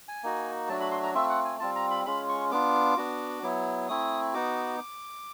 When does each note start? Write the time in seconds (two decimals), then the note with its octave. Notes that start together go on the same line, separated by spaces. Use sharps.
0.08 G#5
0.23 A#3 D#4 F#4
0.69 F#3 A3 D4 F#4 A5
0.80 B5
0.91 C6
1.03 A#5
1.15 A3 C4 F4 E5
1.29 F#5
1.45 G#5
1.60 G3 C4 F4 A5
1.76 A#5
1.91 B5
2.06 G#3 C#4 F4 B5
2.29 C#6
2.52 B3 D4 F4 D6
2.97 B3 D4 F#4
3.43 F#3 B3 E4
3.89 A3 C4 E4 D#6
4.34 B3 D#4 F#4 D6